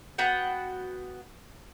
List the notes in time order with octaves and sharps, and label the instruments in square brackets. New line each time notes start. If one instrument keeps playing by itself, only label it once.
[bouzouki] B3 F#4 F#5 G5